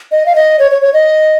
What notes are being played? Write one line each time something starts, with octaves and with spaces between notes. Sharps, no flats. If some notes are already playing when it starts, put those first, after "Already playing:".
D#5
F5
D#5
C#5
C#5
C#5
D#5